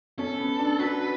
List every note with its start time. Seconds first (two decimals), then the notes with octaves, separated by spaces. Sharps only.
0.19 C#4 A4
0.39 B3
0.59 D4
0.79 F#4 B4